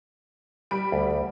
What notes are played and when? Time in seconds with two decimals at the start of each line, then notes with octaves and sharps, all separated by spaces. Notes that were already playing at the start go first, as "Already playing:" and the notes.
0.71 G3 B5 D7
0.92 D2